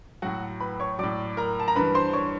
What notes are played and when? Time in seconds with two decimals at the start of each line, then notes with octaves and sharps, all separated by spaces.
0.22 A2 F#3 F#4 F#5
0.60 B4 B5
0.80 C#5 C#6
0.99 A2 F#3 D5 D6
1.37 A#4 A#5
1.60 A5
1.68 A#5
1.76 G2 E3 B4 B5
1.95 C5 C6
2.13 C#5 C#6